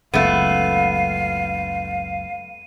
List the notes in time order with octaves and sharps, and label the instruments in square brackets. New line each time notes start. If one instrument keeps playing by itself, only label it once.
[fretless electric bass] F#1 C#2 [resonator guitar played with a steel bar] A3 B3 [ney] F5 [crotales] D#7